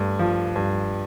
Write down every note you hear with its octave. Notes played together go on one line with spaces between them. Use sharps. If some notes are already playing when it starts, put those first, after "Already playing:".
Already playing: G2 A3
F3
G2